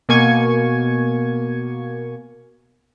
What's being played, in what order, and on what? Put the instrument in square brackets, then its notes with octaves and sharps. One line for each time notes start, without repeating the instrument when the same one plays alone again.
[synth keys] B2 A#3 G#5 C#6 G#6